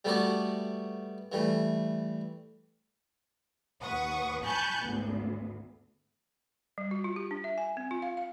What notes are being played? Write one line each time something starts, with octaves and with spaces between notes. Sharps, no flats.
G3 A3 B3 F#4 A4 D5
E3 G3 A3
D#2 B4 F#5 C#6 D#6
G#5 A5 B5 C#6 F#6 G6
G#1 D2 B3
G3
F#4
F4
G4
D4
E5
G#5
C4
F4
F5
F5